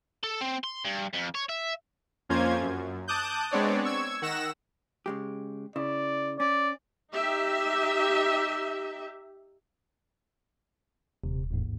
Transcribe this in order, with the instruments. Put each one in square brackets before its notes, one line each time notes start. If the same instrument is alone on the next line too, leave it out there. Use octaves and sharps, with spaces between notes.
[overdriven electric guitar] A4
C4
C6
G2
F2
C#5
E5
[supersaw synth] F2 A#3 C#4 F4 C5 G#6
F#2
A5 D6 D#6 F#6 G6
G#3 B3 C4 D4 C#5 D5
C#6 E6 G#6
D#3 F#5 E6 A#6 E7
[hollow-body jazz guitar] C#3 G#3 G4
[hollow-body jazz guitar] C#3 E4 [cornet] D5
[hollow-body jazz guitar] C#4 [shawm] D5
[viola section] D#4 G4 E5
[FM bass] D#1 [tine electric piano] C3
[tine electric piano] A1 D#2 G#2